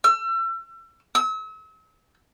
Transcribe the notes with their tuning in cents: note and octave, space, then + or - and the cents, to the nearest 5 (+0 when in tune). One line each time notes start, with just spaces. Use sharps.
E6 +35
E6 -40